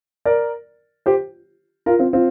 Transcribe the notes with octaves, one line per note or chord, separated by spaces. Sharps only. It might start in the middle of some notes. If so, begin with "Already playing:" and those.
A#4 D5
G4 C5
F4 A#4
C4 F4
C4 F4